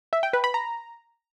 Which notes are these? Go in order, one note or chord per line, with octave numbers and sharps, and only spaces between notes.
E5
G5
B4
B5
A#5